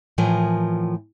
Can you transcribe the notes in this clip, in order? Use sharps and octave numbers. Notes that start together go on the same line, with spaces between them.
A2 E3 F3 A#4 G#5